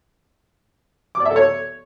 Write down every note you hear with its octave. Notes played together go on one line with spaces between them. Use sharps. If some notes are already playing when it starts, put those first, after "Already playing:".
D6
D5
E5
A4
C#5